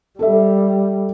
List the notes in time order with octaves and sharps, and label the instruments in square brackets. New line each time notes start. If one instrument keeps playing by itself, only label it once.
[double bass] G3 [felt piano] A4 E5